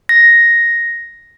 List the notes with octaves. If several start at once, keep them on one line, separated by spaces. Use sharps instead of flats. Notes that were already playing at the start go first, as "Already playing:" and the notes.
A#6